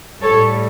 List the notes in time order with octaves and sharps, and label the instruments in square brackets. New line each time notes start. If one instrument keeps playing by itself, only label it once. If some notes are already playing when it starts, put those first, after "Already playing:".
[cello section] A2 G3 A4 C#5